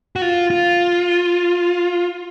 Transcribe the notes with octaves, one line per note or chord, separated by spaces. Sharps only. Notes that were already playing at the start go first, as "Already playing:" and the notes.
F#4
F4
F4